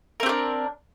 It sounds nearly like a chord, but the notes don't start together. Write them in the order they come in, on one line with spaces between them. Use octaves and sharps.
A#4 C4 G4 D4